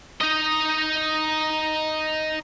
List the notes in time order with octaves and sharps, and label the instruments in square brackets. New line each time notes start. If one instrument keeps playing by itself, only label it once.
[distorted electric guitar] D#4 D#5